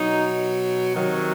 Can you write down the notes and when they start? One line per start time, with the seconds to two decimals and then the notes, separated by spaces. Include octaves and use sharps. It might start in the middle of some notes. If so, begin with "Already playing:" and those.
Already playing: B2 F#3 D#4
0.95 C3 D#3 F#3